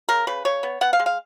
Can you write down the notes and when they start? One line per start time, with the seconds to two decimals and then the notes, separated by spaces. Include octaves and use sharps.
0.09 C#3 A#4
0.27 C#3 B4
0.45 C#3 C#5
0.63 B3
0.81 B3 F#5
0.93 F5
0.99 G#3
1.06 F5